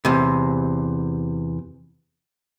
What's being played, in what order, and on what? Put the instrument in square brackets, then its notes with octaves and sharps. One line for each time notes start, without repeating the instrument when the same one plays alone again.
[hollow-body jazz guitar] E2 C3